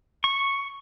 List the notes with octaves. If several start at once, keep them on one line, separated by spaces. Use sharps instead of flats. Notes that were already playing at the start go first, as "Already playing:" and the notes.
C#6